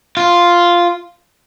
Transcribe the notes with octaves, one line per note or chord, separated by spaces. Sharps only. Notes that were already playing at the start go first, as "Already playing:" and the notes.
F4